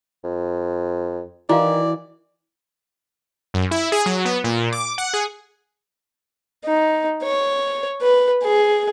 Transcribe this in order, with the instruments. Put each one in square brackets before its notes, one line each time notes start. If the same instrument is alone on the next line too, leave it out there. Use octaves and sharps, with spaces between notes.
[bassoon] F2
[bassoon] D#3 [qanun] E3 [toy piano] E4 F#4 F5 [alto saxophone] D5
[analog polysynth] F#2
E4
G#4
F#3
B3
A#2
D6
F#5
G#4
[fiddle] D#4
C#5
B4
G#4